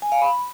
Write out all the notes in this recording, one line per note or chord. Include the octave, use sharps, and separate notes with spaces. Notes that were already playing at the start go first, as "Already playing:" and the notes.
G#5
F5
B5